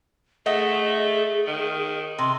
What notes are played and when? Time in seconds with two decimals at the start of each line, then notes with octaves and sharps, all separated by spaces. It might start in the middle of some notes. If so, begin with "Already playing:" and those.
0.46 A3 G#4 D#5 E5 F#5
1.47 D#3
2.18 C3 C6